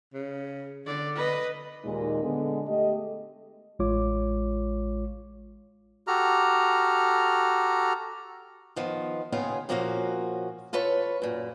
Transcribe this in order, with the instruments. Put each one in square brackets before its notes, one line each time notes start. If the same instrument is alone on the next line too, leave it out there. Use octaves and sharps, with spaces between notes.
[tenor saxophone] C#3
[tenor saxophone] D3 [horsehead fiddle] D5
[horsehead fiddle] B4 D#5
[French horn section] D#2 A#2 G#3 D#4
D3 G#3 B3
A3 G4 D#5
[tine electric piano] A1 G#3 F4 C#5 D6
[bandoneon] F#4 G4 A4 A#5 F6
[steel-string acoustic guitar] D#3 F3 B3
D#2 C#3 B3 F4 G#4 F5
A#2 F3 A#3 C#4 F#4
F4 A4 B4 C#5
F#2 A#2